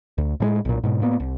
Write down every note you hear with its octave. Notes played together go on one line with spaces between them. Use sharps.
D2
A2 F3 G#3
B1 A#2
G#2 B2
A2 A#3 B3
C2